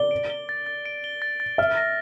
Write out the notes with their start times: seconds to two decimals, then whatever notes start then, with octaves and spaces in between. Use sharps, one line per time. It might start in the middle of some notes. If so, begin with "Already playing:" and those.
Already playing: D5 G7
0.11 D7
0.30 G7
0.49 A6
0.66 A6
0.85 D7
1.04 G7
1.22 A6
1.40 A6
1.58 E5 F6
1.77 A#6